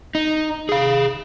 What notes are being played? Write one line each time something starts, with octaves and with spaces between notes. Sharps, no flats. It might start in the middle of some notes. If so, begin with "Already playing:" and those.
D#4
G#4 F5